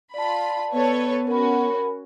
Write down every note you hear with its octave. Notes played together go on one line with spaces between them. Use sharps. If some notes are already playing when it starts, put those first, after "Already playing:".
F4 D5 A5 B5
B3 A4 B4 C#5
C#4 F#4 A#4 B5